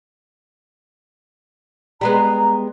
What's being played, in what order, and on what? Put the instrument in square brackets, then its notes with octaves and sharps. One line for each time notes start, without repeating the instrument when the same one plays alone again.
[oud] G3 G#3 B3 [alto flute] A#5